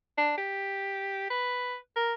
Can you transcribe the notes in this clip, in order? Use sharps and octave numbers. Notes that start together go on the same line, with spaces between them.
D4
G4
B4
A#4